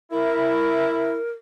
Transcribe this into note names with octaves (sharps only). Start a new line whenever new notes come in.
E4 A#4